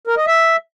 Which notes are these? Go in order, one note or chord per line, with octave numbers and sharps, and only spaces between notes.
A#4
D#5
E5